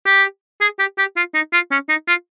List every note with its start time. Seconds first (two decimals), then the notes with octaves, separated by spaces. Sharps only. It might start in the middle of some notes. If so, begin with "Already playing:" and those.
0.06 G4
0.61 G#4
0.79 G4
0.98 G4
1.17 F4
1.34 D#4
1.53 F4
1.71 C#4
1.89 D#4
2.08 F4